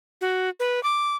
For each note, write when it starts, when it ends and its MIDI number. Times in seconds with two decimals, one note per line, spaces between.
0.21 0.49 66
0.60 0.83 71
0.83 1.16 86